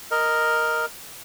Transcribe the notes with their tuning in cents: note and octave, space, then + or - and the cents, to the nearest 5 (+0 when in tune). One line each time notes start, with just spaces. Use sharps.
A#4 +0 D#5 +0